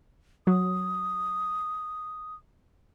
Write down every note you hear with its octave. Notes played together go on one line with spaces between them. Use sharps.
F#3 D#6